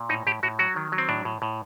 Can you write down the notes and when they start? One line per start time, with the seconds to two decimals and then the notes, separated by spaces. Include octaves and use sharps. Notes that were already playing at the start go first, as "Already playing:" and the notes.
Already playing: A#2
0.09 A2 D#4
0.27 A2 G4
0.43 A2 F#4
0.59 F#3 F#4
0.76 D#3
0.92 F#3
0.98 C4
1.09 A2 D4
1.25 A2
1.42 A2